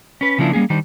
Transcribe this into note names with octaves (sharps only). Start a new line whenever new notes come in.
C#4 B4
C#3 F3 A#3 D4 E4
G3 A#3 C#4 G#4
D#3 G3 D4 D#4 C5